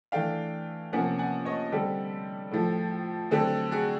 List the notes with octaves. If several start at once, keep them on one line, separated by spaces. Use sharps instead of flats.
E3 A3 D4 F5 G5
C3 F3 A#3 C#4 F#5 G#5
F#5 G#5
C#5 D#5
D3 G3 C4 G4 A4
A2 F3 A3
D3 F#3 A3 C4 G4 A4
F#4 G#4